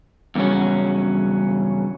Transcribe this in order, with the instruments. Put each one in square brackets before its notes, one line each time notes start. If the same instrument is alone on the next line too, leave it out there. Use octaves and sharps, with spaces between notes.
[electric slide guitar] E2 G2 C#3 F#3 C#4